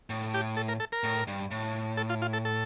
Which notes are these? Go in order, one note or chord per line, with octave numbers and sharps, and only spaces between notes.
A2
G4
A4
A#4
A4
A#4
A2
G2
A2
A4
F4
F4
A4
A4